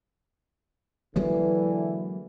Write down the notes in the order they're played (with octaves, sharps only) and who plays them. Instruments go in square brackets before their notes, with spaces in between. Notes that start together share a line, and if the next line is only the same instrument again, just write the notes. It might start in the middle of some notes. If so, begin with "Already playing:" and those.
[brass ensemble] D3 E3 [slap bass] F#3 G#3 A#3